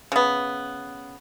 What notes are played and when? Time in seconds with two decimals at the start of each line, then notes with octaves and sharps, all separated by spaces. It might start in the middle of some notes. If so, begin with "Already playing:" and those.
0.12 C#3 B3